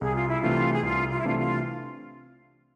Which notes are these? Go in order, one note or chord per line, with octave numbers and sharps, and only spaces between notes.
C2 G#4
F4
E4
C3 E3 A3 D4 F4
G#4
C2 F4
F4
E4
C3 E3 A3 D4 F4
F4